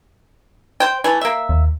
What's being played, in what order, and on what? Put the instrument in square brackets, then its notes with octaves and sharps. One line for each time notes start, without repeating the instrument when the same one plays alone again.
[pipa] C5 G5
E3 A3
A#3 E5
[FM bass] D#2